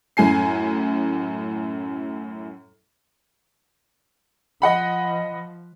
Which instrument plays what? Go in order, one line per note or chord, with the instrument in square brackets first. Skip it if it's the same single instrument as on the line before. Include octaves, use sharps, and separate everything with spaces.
[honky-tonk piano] F#2 A2 G#5 C7
[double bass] F3 [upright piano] D#5 F#5 B5